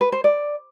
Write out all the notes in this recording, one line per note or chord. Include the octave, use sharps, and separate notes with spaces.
B4
C5
D5